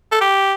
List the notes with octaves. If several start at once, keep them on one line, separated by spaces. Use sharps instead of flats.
A4
G4